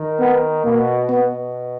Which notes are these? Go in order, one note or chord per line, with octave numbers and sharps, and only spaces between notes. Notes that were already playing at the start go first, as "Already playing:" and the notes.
Already playing: D#3
B3
B2 A#3
B2 B3